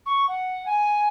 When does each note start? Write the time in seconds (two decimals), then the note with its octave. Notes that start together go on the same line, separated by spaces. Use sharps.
0.06 C#6
0.28 F#5
0.66 G#5